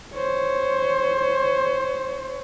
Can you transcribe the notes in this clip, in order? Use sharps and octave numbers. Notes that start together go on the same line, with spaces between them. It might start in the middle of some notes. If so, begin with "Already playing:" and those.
C5 C#5